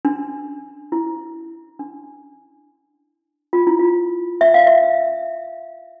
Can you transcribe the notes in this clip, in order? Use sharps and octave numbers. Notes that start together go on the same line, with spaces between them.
D4
E4
D4
F4
E4
F4
E5
F5
E5